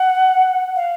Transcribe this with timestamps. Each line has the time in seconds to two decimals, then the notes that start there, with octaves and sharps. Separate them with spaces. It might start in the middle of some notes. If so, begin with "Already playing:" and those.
Already playing: F#5
0.76 F5